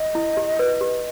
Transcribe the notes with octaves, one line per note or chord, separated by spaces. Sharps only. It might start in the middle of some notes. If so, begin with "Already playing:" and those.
Already playing: D#5
E4
G4
B4
G4